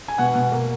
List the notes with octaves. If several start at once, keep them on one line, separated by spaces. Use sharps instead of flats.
G#5
B2 F#5
B2
A#3